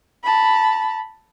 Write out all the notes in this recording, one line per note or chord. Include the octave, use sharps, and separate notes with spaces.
A5 B5